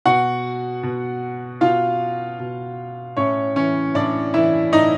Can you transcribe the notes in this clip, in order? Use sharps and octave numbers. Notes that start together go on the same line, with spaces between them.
B2 F#4 F#5
B2
B2 F4 F5
B2
A2 C#4 C#5
E3 C#4 C#5
A2 D4 D5
E3 E4 E5
A2 D#4 D#5